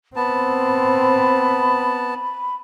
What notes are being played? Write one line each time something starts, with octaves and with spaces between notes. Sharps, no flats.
B3 C4 A5 B5